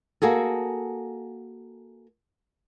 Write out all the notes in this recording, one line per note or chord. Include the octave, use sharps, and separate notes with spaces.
A#3 F#4 G#4 A4